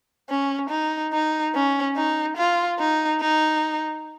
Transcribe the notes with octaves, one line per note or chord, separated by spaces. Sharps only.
C#4
D#4
D#4
C#4
D#4
F4
D#4
D#4